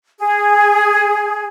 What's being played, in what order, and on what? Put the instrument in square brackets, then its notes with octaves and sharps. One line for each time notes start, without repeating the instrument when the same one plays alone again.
[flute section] G#4